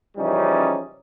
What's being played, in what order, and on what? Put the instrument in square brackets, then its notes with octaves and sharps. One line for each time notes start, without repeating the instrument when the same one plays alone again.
[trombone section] C#3 E3 F3 G3 C#4 D#4